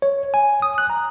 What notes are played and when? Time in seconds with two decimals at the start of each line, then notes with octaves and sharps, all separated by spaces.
0.02 C#5
0.34 G#5
0.62 D#6
0.78 F#6
0.90 A#5